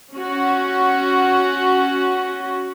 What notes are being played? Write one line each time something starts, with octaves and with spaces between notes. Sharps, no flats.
C#4 F#4